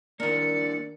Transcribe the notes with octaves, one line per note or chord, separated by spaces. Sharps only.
D#3 A#3 D4 E4 A#4 D5 C#7